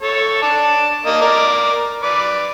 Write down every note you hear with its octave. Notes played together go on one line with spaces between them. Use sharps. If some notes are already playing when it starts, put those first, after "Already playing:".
A4 C#5
D5 A5
A#3 D#5
A#4 D5
B4 D5